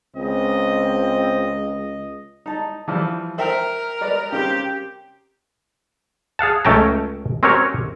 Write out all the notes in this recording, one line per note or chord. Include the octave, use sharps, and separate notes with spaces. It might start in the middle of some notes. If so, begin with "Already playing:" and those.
C#2 C4 D#5
D#4 A5
E3 F3 G3
A#4 C5 E5 G5
B4 D5 D#5
C#3 C4 G4
G#4 F5 F#5 A5
C#2 A3 C#4 G5 A5 A#5
C4 C#4 F#4 G4 A#4 C#5